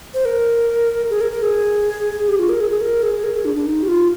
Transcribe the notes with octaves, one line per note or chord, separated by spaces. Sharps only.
C5
A#4
G#4
A#4
A#4
G#4
G4
F4
A#4
G#4
G#4
A#4
G#4
A#4
G#4
D4
D4
D#4
G4
F4